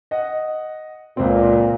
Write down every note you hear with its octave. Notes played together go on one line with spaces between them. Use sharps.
D#5 F#5
C#2 A#2 C4